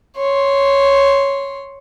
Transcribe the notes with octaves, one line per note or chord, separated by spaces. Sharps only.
C#5 C6